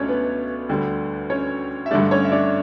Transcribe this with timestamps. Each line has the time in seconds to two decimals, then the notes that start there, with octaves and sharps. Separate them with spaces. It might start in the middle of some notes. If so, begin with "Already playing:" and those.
Already playing: C#2 B2 A3 C#4 D4 C#5 D5
0.08 B3 B4
0.69 D2 D3 G3
1.30 C#4 C#5
1.86 E5
1.91 G2 D3 A3 D4 D5
2.11 C#4 C#5
2.25 E5
2.32 D4 D5